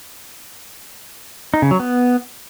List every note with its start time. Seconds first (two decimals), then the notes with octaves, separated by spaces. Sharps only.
1.54 D#4
1.62 C#3
1.71 F#3
1.80 B3